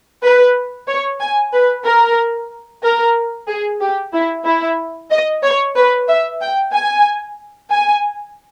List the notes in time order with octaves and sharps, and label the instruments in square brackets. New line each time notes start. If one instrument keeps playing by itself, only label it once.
[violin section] B4
C#5
G#5
B4
A#4
A#4
G#4
G4
E4
E4
D#5
C#5
B4
E5
G5
G#5
G#5